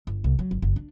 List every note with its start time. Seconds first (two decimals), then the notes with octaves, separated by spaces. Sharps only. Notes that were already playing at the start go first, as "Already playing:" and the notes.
0.07 G1
0.24 C2
0.39 F#3
0.51 G1
0.62 F#1
0.76 D4